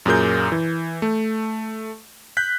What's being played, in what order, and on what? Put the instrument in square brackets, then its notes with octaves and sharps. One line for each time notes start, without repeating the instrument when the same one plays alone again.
[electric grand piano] F#2 A#2 G#4 A#4 G6
E3
A3
F#6 G6 B6